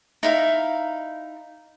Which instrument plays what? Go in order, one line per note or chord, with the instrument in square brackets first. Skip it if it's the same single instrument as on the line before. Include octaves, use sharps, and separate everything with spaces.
[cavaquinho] D#4 E4 F5